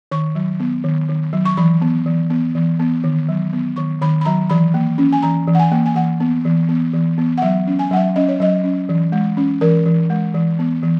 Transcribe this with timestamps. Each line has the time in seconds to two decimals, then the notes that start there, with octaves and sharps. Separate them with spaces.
0.11 D#3 C#6
0.35 F#3
0.60 B3
0.84 D#3
1.09 D#3
1.33 F#3
1.45 C#6
1.57 E3 B5
1.81 B3
2.06 E3
2.30 B3
2.55 E3
2.79 B3
3.04 D#3
3.29 F#3
3.53 B3
3.76 D#3 C#6
4.01 D#3 B5
4.21 B5
4.25 F#3 A#5
4.50 E3 B5
4.74 A#3
4.98 C#4
5.13 G#5
5.22 E3 A#5
5.48 E3
5.55 F#5
5.59 G#5
5.72 A#3
5.86 G#5
5.96 E3 F#5
6.20 B3
6.45 E3
6.69 B3
6.93 E3
7.18 B3
7.38 F#5
7.42 F#3 E5
7.67 C#4
7.79 G#5
7.91 F#3 F#5
7.97 E5
8.16 C#4 D#5
8.28 C#5
8.40 F#3 D#5
8.64 C#4
8.89 E3
9.12 G#3
9.37 C#4
9.61 E3 A#4
9.86 E3
10.10 G#3
10.34 E3
10.59 B3
10.83 E3